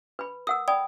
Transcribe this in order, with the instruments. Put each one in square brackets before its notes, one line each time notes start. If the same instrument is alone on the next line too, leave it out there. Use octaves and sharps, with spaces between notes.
[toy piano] B4 B5
[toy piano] A#4 F#5 E6 [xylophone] D#6
[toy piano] D5 B5 D#6 [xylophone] G5